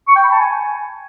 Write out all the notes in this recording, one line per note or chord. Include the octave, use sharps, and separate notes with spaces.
C#6
G5
B5
A5
G#5